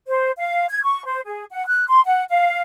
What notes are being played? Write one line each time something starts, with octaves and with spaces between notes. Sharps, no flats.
C5
F5
G#6
C#6
C5
G#4
F#5
F#6
C6
F#5
F5